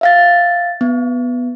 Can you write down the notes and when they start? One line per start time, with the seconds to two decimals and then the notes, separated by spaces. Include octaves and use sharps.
0.01 E5 F5 A6
0.81 B3